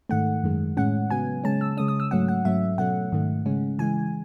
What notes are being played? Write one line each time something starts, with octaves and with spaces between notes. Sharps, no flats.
G#2 D#3 A3 F#5
F#2 D#3 G#3
A2 G#3 C#4 F#5
C#3 F#3 B3 G#5
C#3 G#3 C#4 A5
E6
C#3 G#3 C#4 D#6
D#6
E6
G#2 F#3 A3 C#4 F#5
F#5
G#2 F#3 A3 C#4 E5
B2 F#3 A3 C#4 F#5
G#2 D#3 A3
C#3 G#3 C#4
C#3 E3 G#3 G#5